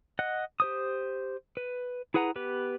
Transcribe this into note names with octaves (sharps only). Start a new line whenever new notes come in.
D#5 F#5 F#6
G4 C5 D#6
B4
E4 G#4 B4 F#5 A#5
B3 G4 B4